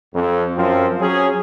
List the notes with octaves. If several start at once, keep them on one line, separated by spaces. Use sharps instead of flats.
F2
F#2 F3 C4 F4
F#3 C#4 G#4